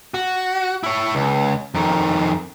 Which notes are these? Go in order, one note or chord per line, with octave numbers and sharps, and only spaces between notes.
F#4
E4 C#5
C#2
F2 D#3